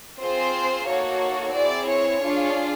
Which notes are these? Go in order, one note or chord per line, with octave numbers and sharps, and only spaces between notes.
C4 F4 G#4 C5
A#3 D#4 F#4 A4 C#5
C4 E4 G#4 D5
C#5
D4 F4 G#4